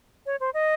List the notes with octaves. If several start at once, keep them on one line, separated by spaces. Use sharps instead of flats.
C#5
C5
D#5